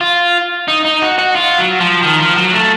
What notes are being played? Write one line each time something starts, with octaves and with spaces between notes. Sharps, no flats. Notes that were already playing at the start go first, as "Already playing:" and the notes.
F4
D#4
D#4
F#4
F#4
F4
F#3
F3
D#3
F3
F#3
A3